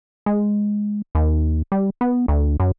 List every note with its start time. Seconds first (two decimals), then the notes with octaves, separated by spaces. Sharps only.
0.26 G#3
1.15 D#2
1.72 G3
2.01 B3
2.28 D2
2.60 F#2